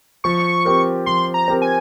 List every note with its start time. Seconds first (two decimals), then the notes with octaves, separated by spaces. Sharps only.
0.24 F3 C#6
0.65 C4 G4 A#4
1.06 F3 C6
1.34 A#5
1.48 C4 G4 A#4
1.62 G#5